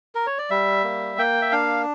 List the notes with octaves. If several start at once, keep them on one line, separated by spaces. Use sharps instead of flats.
A#4
C#5
D5
G3 E5
A#3
A#3 G5
E5
D4 F5